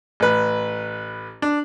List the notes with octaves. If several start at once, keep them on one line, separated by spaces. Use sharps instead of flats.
A1 B4
D4